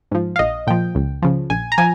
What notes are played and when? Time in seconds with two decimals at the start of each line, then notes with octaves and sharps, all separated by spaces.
0.11 G#2 F3
0.36 F5
0.39 A#1 D#5
0.67 A#2 F3 G5
0.95 C#2
1.22 C#3 F3
1.50 A#1 G#5
1.72 A#5
1.78 F3 G#5